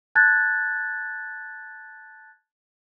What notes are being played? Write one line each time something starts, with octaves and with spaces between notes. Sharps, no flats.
A5 F#6 G#6 A6